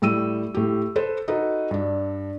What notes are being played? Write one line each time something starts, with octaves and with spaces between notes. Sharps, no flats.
A2 G3 E6 D#7
A2 G4
A4 B4 C5
D#4 F#4 A4 B4
G2 D4